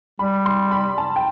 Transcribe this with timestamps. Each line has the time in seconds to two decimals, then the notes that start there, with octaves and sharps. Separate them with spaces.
0.19 G3 B5
0.46 C6
0.72 B5
0.98 A5
1.16 G5